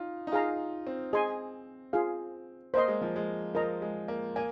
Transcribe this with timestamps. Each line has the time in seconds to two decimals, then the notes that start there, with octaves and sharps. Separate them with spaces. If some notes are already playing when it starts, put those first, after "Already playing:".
Already playing: D#4 F4
0.27 D#4
0.32 F4 G#4 F5 A#5
0.87 C4
1.13 G#4 D#5 G#5 C6
1.93 F4 G#4 F5
2.74 A#3 C5 D#5 C6
2.88 G#3
3.02 F3
3.16 G#3
3.55 F3 A#4 D#5 A#5
3.82 G#3
4.08 A#3
4.36 A#3 G#5